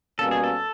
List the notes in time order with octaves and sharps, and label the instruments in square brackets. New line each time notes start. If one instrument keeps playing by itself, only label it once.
[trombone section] B2 G3 A#3 C#4 [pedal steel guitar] A4
[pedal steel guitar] G#4
A4